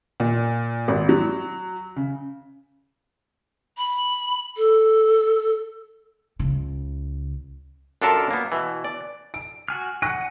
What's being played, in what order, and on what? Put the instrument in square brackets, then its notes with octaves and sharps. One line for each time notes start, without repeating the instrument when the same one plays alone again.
[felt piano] A#2
G#1
F#3
C#3
[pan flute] B5
A4
[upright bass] C#2 C#3
[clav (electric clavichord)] F#2 D4 F4 A4 A#4 A5
A#3 B3
B2 E3
D5
[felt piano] D7
[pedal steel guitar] F#4 G#5 F6
[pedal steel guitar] F#5 G#5 [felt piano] C#6 F#6 A#6